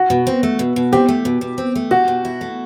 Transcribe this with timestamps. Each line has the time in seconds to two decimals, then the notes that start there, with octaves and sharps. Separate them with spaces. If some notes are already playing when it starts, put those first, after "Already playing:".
Already playing: F#4
0.10 B2
0.27 C4
0.43 A3
0.59 B2
0.76 B2
0.93 C4 G4
1.08 A3
1.25 B2
1.41 B2
1.58 C4
1.75 A3
1.91 F#4 G4
2.08 B2
2.25 E4
2.41 A3